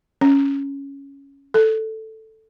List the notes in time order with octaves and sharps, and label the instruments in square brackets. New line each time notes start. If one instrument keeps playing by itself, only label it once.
[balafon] C#4
A4